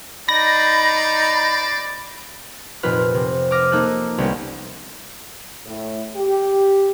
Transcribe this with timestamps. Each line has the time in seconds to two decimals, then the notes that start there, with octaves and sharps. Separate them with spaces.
0.29 D#4 C5 D5 B5 A#6
2.83 F1 A#2 F4 B4 F6 F#6
3.14 C3
3.51 D6 D#6 F6 A#6
3.72 A#3 D#4 A4 F#6
4.18 C2 B3 C#4 D#4
5.66 A2
6.15 G4